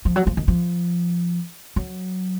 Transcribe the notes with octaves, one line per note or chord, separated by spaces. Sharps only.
F3
F#3
F3
D#3
F3
F#3